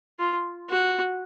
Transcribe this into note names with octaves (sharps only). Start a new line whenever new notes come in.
F4
F#4